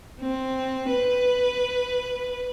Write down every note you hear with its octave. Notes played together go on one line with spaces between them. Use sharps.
C4
B4